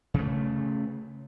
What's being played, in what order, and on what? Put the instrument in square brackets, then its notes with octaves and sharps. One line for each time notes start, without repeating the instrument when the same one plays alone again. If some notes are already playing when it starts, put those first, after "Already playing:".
[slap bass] C#3 A3